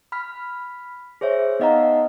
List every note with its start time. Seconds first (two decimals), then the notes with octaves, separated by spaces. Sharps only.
0.12 B5 F6 B6
1.21 G#4 C5 C#5 E5
1.60 B3 D#4 D#5 F5 F#5 A#5